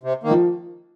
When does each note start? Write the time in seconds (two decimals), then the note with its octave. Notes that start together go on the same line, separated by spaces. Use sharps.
0.03 C3
0.23 D#3 A#3
0.31 F3